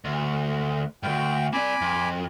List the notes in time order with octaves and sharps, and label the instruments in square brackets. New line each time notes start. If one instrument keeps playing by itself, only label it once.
[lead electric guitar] D2
[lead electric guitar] D2 G2 [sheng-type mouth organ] G5
[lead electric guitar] C4 D5 [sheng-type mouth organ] G#5 B5 D6
[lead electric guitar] F2